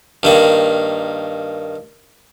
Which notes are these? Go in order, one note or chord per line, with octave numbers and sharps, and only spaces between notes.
G2 D#3 A#3